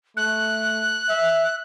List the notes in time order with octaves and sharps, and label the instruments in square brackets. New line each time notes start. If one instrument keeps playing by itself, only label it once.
[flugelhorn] A3 [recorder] F#6
[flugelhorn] E5